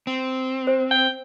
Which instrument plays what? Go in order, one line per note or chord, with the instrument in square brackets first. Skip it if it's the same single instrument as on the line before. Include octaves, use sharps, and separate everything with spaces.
[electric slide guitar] C4
[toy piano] C5
[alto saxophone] G5